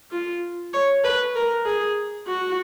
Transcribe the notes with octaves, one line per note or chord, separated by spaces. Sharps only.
F4
C#5
B4
A#4
G#4
F#4